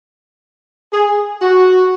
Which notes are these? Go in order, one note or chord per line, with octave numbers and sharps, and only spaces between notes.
G#4
F#4